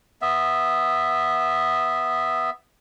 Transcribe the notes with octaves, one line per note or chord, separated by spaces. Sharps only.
B3 E5